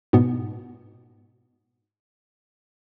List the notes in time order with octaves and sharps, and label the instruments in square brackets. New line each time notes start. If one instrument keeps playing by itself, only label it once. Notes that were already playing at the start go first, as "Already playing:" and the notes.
[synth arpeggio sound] G#2 B2 B3